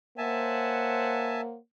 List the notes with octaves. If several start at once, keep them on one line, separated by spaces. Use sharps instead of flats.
A#3 C5 C#5 E5 F#5 G#5 A5